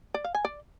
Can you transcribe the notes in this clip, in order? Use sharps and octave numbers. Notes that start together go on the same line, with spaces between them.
D5
F5
G#5
D5